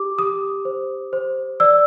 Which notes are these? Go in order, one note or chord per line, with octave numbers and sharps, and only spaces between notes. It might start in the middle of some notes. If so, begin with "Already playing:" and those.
Already playing: G4 D6
G4 D#6
C5
C5
D5 E6